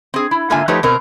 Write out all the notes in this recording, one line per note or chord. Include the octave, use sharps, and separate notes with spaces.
C4 G#4
E4
G#2 D3 A#3 F4 E5 G#5
F3 A3 D#4 G4 B4 C#5
B2 C4 A#4